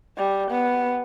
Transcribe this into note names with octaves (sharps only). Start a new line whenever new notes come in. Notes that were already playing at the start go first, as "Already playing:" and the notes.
G3
B3